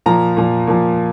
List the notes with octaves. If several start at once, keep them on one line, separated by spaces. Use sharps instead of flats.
A#2 F3 A#5
A#2 F3
A#2 F3